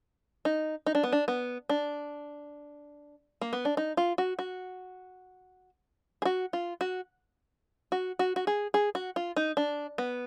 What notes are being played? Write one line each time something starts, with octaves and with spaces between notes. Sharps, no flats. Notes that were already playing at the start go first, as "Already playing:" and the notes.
D#4
D#4
D4
B3
D4
B3
D4
A#3
B3
D4
D#4
F4
F#4
F#4
G#4
F#4
F4
F#4
F#4
F#4
F#4
G#4
G#4
F#4
F4
D#4
D4
B3